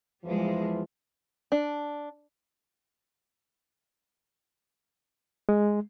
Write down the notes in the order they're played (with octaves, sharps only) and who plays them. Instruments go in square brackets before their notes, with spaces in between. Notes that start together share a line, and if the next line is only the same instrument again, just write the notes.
[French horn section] E2 E3 F3 [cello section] G3 G#3
[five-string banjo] D4
[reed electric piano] G#3